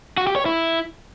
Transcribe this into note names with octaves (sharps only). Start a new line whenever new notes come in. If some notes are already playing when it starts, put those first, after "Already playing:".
F#4
G4
C#5
E4